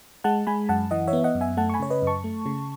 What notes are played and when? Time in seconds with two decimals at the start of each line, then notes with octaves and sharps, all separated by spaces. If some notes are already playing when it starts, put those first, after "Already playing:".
0.24 G#3 F#5 A5
0.47 G#3 G#5 B5
0.69 F#2 F#5 A5
0.91 E3 D#5 F#5
1.07 C#5 E5
1.13 B3
1.24 D#5 F#5
1.35 F#2
1.41 E5 G#5
1.57 A3 F#5 A5
1.70 C#6
1.74 G#5 B5
1.80 C#3 C#5
1.90 B4 D#5
2.02 F#2 A5 C#6
2.24 A3
2.46 C#3